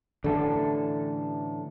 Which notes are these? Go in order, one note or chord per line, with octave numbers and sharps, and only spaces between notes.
A2 D3 E3 A4